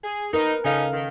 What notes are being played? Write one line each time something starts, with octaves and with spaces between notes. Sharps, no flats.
G#4
D#4 A#4 B4
C#3 C#4 D#4 A4 F5
D#3